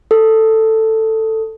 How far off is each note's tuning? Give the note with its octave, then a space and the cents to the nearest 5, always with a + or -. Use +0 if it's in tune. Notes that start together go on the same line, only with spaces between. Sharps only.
A4 +10